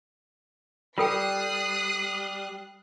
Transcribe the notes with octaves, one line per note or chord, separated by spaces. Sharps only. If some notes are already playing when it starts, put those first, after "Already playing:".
G3 F4 A4 G5 D#6 F#6 C7